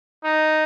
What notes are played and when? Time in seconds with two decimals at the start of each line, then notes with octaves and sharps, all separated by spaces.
0.24 D#4